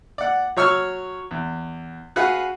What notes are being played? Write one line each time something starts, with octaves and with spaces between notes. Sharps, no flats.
D5 F#5
F#3 C#5 C#6 E6 F6
E2
F#4 G#4 B4 F5 F#5